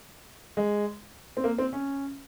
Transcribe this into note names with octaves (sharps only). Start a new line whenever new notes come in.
G#3
C4
A#3
C4
C#4